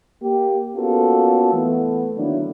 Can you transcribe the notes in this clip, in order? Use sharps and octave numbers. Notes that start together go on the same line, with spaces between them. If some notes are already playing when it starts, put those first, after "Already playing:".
A#3 G4
A#3 B3 C#4 F4 F#4 A4
E3 A3 B3
D3 D#3 F#3 A#3 D4 E4